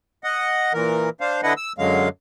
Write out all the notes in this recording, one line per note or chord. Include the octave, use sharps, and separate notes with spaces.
D#5 F#5
A#2 E3 A#4
D4 C5 F5
D3 D4 E4 B4 D#5 F#5
E6
F#2 D3 F#3 G#3 F5